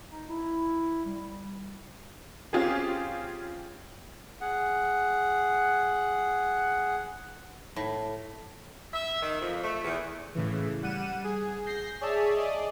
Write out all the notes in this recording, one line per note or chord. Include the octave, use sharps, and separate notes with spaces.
D#4
E4
G3
C4 C#4 F4 G4 G#4
G#4 F#5
A2
E5
D#3
F2
A3
E2
A2 C#3 E3
G3 F#5 D#7 E7
G#4
G6 A#6 C7
G#4 C#5 D5 E5 A5
G#4 D5 D#5